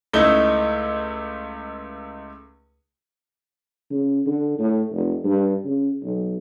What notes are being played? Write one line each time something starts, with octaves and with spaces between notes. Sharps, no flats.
C#2 A3 D#4 E4 G7
C#3
D3
A2
F1
G2
C#3
B1